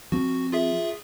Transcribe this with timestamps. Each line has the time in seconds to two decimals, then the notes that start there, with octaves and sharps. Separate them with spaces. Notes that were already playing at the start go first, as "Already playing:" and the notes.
0.12 F3 C4 F#4
0.52 F4 G#4 E5